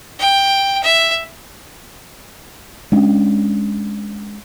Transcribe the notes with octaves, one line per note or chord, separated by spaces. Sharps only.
G5
E5
G#3 C#4 D4